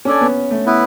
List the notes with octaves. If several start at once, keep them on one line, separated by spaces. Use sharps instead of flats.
C#4 D4 A4 D5 G#5
B3
A3
B3 E4 B4